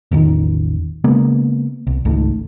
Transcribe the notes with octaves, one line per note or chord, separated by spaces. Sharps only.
A1 E2 D#3
C#3 G#3 A#3 B3
C2
G#1 C#2 G#2 A3